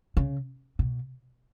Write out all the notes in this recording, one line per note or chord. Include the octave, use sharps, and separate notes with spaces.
C#3
B2